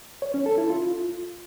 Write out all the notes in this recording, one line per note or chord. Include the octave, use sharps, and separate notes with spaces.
C#5
C#4
A4
E4
F4